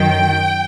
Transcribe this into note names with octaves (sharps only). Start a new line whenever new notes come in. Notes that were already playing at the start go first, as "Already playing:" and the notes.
Already playing: F#2 D#3 F#3 G5